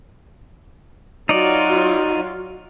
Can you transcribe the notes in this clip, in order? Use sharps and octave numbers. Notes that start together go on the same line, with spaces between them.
F#3 D#4 F4 F#4 D5